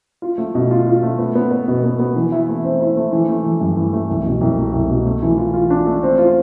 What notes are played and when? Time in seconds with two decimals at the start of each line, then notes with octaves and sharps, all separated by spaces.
0.22 F4
0.38 A3
0.55 B2
0.71 F4
0.86 F4
1.03 A3
1.19 B3
1.35 B3
1.51 B4
1.68 B2
1.84 B3
1.99 B3
2.16 E3
2.32 E4
2.48 A3
2.64 C4
2.80 E4
2.96 A3
3.12 E3
3.29 A3
3.44 E3
3.61 G2
3.76 E3
3.93 A3
4.09 C2
4.26 B2
4.41 C2
4.58 A3
4.73 C2
4.90 B2
5.05 A3
5.22 E3
5.38 F4
5.54 F4
5.70 D4
5.87 A3
6.03 C4
6.18 F4